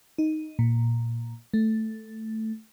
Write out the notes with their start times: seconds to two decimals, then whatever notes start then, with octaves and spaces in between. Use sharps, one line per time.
0.18 D#4
0.59 A#2
1.54 A3